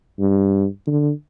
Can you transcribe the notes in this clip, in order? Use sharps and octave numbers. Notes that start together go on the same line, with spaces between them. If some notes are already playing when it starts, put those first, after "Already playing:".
G2
D3